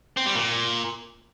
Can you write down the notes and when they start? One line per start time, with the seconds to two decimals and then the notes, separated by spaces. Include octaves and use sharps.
0.17 C4
0.26 G3
0.35 A#2